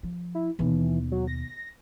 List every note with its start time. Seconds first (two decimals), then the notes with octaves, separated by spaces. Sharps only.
0.03 F3
0.35 E4
0.59 D#2 B2 E3
1.11 F#3
1.27 A#6